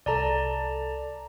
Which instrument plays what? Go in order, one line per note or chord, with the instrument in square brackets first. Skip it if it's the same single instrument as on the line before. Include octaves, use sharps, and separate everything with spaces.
[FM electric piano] C2 A4 [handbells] D5 A5 A#5